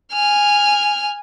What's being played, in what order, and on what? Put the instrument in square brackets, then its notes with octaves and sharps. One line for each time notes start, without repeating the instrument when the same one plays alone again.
[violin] G#5 F6